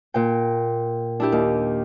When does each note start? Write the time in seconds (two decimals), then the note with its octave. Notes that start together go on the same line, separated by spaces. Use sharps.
0.14 A#2 G5
1.20 D4 E4 G4
1.32 D#2